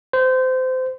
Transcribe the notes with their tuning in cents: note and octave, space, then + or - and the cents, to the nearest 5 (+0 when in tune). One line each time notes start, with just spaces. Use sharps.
C5 -25